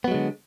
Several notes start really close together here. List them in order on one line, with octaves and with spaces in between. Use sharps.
B3 F#3 G#3 D3